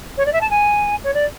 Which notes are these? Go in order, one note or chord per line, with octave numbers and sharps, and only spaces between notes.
C#5
D5
E5
A5
G#5
C#5
D5